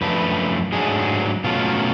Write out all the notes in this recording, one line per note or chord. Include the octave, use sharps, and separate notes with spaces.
F#2 F3 A3 D4 B4
G#2 F#3 A3 D4 G#4
B2 F#3 A3 C#4 F4